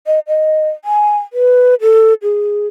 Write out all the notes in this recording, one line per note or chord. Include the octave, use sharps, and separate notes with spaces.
D#5
D#5
G#5
B4
A4
G#4